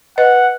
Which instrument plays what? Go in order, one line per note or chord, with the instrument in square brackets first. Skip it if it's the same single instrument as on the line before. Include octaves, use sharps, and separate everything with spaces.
[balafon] B4 D#5 [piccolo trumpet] F#5